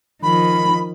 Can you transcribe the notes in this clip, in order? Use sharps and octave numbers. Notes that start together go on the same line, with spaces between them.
D#3 F3 B5